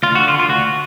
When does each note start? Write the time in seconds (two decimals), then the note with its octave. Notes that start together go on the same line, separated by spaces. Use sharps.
0.03 D2 F4
0.15 D3 F#4
0.28 F4
0.34 D3
0.39 F4
0.49 D2 F#4